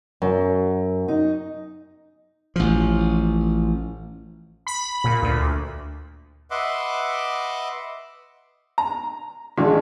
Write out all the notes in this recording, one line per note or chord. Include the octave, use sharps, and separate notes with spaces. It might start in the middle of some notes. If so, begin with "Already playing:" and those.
F#2
D#4
A1 F3
B5
A#2
D2
B4 D#5 E5 F#5 C6 D6
A#5
A1 G#3 D4 F#4